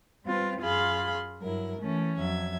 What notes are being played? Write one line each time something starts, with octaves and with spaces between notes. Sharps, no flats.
G3 C4 F4 B4
F#2 F4 G#4 F5 B5 C6
G2 F#3 E4 A#4
E3 A3 C#4
F2 F#3 E5 G#6